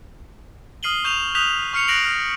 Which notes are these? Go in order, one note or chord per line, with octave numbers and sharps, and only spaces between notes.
D#6 F6 C7 D#7 F#7 G7
C#6 G6 E7 F7
D#6 F#6 G6 B6 E7 F7
C#6 F6 C7 C#7 F7
F#6 A#6 C7 D7 F7 F#7
F6